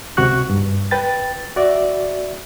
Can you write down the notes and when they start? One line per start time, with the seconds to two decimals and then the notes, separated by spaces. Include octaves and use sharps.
0.17 C#2 C3 F#4 C#6 F#6
0.50 G2
0.91 B4 G5 A6
1.56 F#4 D5 E5